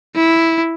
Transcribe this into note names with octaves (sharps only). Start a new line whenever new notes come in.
E4